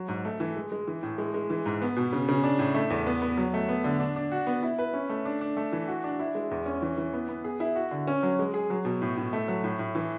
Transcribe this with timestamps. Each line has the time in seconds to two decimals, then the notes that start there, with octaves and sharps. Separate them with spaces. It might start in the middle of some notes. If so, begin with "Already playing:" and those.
Already playing: F#3
0.08 G#2
0.25 A3
0.40 E3
0.56 G#3
0.72 G#3
0.88 E3
1.03 A2
1.18 G#3
1.34 G#3
1.50 E3
1.66 G#2
1.82 B3
1.96 B2
2.13 C#3
2.28 C#3
2.43 D4
2.59 A2
2.75 A3
2.90 E2
3.06 B3
3.22 B3
3.37 F#3
3.54 A3
3.69 B3
3.84 D3
4.00 D4
4.16 D4
4.32 F#4
4.47 B3
4.63 E4
4.79 B4
4.93 C#4
5.10 A3
5.25 D4
5.41 D4
5.57 A3
5.72 E3
5.88 F#4
6.04 D4
6.19 E4
6.35 G#3
6.51 E2
6.66 C#4
6.82 E3
6.98 E3
7.13 B3
7.29 B3
7.44 G#4
7.60 E4
7.76 F#4
7.91 D3
8.07 C#4
8.23 F#3
8.39 G#3
8.54 G#4
8.70 F#3
8.85 B2
9.02 A2
9.17 A2
9.33 A3
9.48 F#3
9.64 A2
9.79 A2
9.95 E3